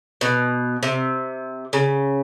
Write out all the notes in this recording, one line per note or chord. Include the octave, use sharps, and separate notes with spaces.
B2
C3
C#3